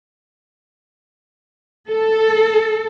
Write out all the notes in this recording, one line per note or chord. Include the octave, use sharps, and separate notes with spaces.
A4